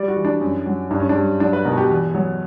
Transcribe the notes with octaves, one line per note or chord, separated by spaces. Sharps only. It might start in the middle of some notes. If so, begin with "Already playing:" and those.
Already playing: G3 D5
F#4
E3
D4
F#2
F#3
G2 D4
C#4
D4
G3
F#3 D4
B4
B2 A#4
F#4
G4
E2
F#3